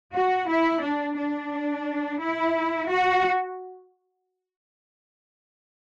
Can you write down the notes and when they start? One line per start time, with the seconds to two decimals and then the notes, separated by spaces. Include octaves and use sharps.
0.13 F#4
0.48 E4
0.82 D4
1.16 D4
2.20 E4
2.88 F#4